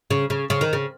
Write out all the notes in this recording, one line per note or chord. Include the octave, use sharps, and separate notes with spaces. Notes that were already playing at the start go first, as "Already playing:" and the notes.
C#3
C#3
C#3
D#3
C#3